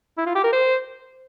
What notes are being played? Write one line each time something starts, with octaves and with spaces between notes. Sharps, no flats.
E4
F4
G4
A#4
C5